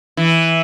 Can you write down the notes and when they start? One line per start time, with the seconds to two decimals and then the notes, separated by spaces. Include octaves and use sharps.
0.17 E3